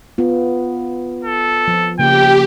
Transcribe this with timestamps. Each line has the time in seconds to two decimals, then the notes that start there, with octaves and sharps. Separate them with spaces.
0.18 B3 F4
1.24 A4
1.68 F3
1.99 C#3 A#3 G4 G5